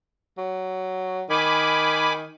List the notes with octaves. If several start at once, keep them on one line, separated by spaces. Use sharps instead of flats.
F#3
D#3 G#5 B5 D6